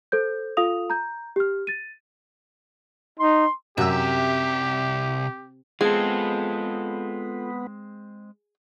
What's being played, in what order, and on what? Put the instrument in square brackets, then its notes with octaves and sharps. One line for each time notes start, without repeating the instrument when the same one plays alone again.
[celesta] A4 C5 G6
F4 A4 F5 D#6 F7
A#5 G6
G4 F6
A6 D#7
[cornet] D#4 [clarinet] C6
[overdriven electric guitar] C2 E5 [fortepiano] F#2 E6 [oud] C3 [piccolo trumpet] G4
[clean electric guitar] G#3 C4 [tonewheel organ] B3 [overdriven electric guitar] F4 A4 [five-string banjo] G#4